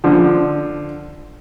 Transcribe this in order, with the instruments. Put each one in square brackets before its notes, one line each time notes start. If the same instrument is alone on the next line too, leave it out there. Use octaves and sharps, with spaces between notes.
[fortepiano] D3 F3